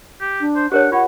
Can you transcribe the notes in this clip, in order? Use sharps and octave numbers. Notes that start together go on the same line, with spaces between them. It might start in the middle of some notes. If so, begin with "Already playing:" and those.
G4
D4
C5
D4 G4 A#4 C#5 F#5
F4 C#5 F#5